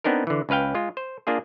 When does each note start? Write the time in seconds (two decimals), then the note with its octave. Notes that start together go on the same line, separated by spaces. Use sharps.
0.04 B3 C4 D4 D#4 A#4
0.27 D3 E3
0.49 C#2 C#4 B4 F5 G5
0.75 G#3 F4
0.97 C5
1.27 A#3 D4 F4 G#4